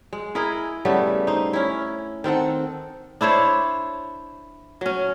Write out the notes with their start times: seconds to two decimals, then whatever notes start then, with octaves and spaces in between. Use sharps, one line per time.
0.13 G#3
0.35 E4 G#4 A#4 D#5
0.85 C#3 G3 A3 B3
1.27 D#4 C5
1.53 C#4 E4
2.24 D#3 C4 A4 F#5
3.21 D4 E4 C5 C#5
4.81 F#3 C#4